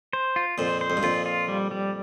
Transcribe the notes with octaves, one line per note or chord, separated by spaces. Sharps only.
C5
F4
F2 A#2 C5
C5
F2
G2
F2 A#2 F4
F4
G3
G3